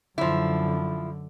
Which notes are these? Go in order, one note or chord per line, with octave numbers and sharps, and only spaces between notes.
F#2 D3 F3 E4